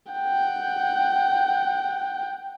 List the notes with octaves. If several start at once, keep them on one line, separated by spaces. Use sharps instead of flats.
F#5 G5